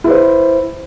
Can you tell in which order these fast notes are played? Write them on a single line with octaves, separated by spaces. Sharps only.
E4 B4 C5